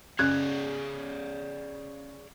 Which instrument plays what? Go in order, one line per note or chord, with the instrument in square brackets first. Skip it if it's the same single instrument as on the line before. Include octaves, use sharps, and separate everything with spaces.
[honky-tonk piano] C#3 [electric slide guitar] G#4 C#5 D5 [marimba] F#6 G#6